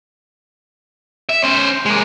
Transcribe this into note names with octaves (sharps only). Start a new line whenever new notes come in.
E5
C#4 C5
G#3 A#3